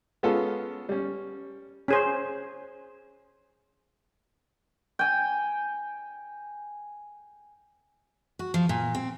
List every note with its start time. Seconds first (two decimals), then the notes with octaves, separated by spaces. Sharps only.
0.23 G#3 B3 C#4 F4 A4
0.89 G3 C#4
1.88 C#4 G#4 C5
4.99 G5 G#5
8.39 F#4
8.54 F3
8.69 A#2
8.95 C4